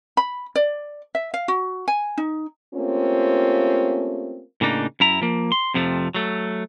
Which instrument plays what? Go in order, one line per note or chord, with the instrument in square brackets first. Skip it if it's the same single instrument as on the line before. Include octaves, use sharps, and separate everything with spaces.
[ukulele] B5
D5
E5
F5
F#4
G#5
D#4
[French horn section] A3 A#3 C4 C#4 F4 G4
[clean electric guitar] A2 C#3 A#3 D4 D#4
F#2 E4 A#5
F3 A#3
C6
F2 C3 F3 A3
F#3 A3